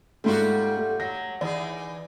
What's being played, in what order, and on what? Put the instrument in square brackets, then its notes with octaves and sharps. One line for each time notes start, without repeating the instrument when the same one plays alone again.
[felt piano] G#2 A3 [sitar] G3 F4 F#4
[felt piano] A3
[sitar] F#3 [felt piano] A#6
[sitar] E3 D#4 G#4 [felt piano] D5